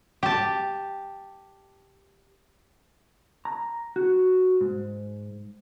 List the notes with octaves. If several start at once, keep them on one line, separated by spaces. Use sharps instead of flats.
G4 A5
A#5
F#4
G#2